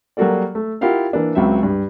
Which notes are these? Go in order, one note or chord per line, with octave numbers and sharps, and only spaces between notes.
F#3 G3 A#3 F#4 A4 D5
A3
E4 F4 G4 A#4 F5 F#5
E3 A#3 D4
C#2 F#3 C4 E5
G2